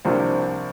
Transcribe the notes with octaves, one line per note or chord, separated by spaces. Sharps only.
C2 C3 F3 A#3 D4